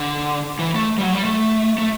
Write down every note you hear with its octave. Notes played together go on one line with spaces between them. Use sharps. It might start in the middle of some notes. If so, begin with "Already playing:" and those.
Already playing: D3
E3
A3
G3
F#3
G3
A3
A3